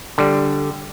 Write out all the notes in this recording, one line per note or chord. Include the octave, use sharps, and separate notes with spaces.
D3 G3